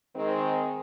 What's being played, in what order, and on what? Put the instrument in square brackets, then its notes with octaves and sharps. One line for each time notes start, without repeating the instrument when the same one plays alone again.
[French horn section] D#3 G#3 C4